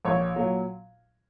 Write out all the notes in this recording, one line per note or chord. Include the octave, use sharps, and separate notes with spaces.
A#1 C#5
A#2 F#3